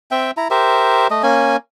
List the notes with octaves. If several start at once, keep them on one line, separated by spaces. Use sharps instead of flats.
C4 E5 G5
E4 A#5
G4 A#4 C5 E5
A3 D#5
A#3 C#4 G#5